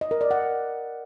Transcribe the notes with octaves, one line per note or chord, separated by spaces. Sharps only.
D#5
A#4
D5
F#5